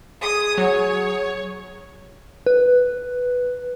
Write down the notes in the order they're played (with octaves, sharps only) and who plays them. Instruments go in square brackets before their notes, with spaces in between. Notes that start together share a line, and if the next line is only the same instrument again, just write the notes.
[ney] G#4 [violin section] D#6
[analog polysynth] F#3 [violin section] C#5
[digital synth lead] B4